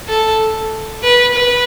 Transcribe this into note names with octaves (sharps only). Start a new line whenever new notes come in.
A4
B4
B4